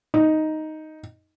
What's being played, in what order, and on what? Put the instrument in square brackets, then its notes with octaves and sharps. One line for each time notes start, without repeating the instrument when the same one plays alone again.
[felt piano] D#4